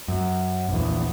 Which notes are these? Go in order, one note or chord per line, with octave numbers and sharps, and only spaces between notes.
F#2
A#1 E2